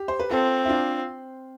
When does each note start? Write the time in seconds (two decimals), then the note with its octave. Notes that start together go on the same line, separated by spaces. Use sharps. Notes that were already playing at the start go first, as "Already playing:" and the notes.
Already playing: G4
0.08 C5
0.20 B4
0.31 C4 F4 A4
0.65 E4
0.69 D4 F4